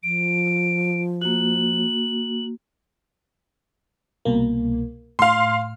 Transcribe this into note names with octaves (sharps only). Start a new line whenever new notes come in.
F3 D7
A#3 F#4 F#7
C2 B2 A#3
A2 F5 C6 F6